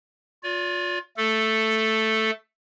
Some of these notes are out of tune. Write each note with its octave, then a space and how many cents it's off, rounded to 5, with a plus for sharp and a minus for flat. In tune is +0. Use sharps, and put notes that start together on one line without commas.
F4 +30 D5 -35
A3 +5 A4 +0